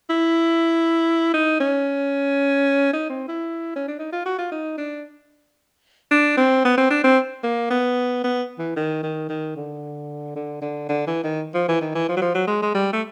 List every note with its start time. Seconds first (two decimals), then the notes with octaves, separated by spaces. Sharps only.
0.10 E4
1.34 D#4
1.60 C#4
2.93 D#4
3.10 C4
3.28 E4
3.76 C#4
3.88 D4
3.99 D#4
4.12 F4
4.26 F#4
4.38 F4
4.52 D#4
4.78 D4
6.11 D4
6.37 C4
6.65 B3
6.78 C4
6.90 D4
7.04 C4
7.43 A#3
7.70 B3
8.24 B3
8.59 E3
8.76 D#3
9.03 D#3
9.29 D#3
9.56 D3
10.36 D3
10.62 D3
10.89 D3
11.07 E3
11.23 D#3
11.54 F3
11.68 E3
11.81 D#3
11.95 E3
12.09 F3
12.17 F#3
12.21 F3
12.35 F#3
12.47 G#3
12.62 G#3
12.74 G3
12.93 A3